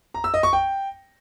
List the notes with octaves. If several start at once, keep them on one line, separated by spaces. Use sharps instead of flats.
A#5
E6
D#5
C#6
G5